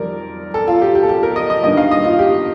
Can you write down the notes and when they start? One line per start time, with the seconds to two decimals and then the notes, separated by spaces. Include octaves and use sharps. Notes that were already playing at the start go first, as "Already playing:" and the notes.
Already playing: F2 D#3 G3 A#4 D5
0.54 A4
0.68 F4
0.82 G4
0.95 G4
1.03 A4
1.09 G4
1.23 A#4
1.36 D#5
1.50 D#5
1.63 G2 D#3 A#3 D#5
1.77 F5
1.91 D#5
2.04 F4
2.19 G4